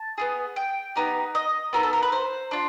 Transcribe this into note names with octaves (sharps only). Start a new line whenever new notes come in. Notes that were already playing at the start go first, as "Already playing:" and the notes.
Already playing: A5
B3 E4 G#4
G5
B3 D#4 G4
D#5
B3 D#4 F#4 A4 A#4
A4
A#4
B4
C5
D4 F4